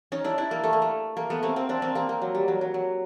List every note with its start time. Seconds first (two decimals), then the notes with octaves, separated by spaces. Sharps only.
0.12 C#4 D#4
0.24 D4 E4
0.38 D4 E4
0.51 A#3
0.63 A3
0.73 A#3
0.82 A3
1.17 A#3
1.30 A3 B3
1.43 A#3 C4
1.56 A#3 C4
1.69 C4 D4
1.82 A#3 C4
1.95 A#3 C4
2.09 A#3
2.22 F#3
2.35 G3
2.48 F#3
2.61 F#3
2.74 F#3